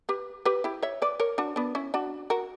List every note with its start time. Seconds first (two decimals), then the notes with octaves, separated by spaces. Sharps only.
0.09 G4 B4
0.45 G4 B4
0.64 E4 G4
0.83 C#5 E5
1.02 B4 D5
1.20 A#4 C#5
1.38 D4 F#4
1.56 B3 D4
1.75 C#4 E4
1.94 D4 F#4
2.30 F#4 A#4